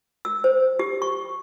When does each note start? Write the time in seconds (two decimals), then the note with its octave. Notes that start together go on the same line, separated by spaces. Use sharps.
0.25 E6
0.44 C5
0.79 G4
1.02 C#6